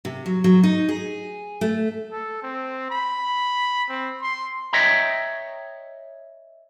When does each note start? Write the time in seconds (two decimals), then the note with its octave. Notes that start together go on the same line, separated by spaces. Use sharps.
0.05 C3
0.26 F#3
0.44 F#3
0.63 D#4
0.89 G#4
1.61 A3
2.12 A4
2.43 C4
2.90 B5
3.89 C4
4.22 C6
4.73 C#5 D#5 E5 G5 A#5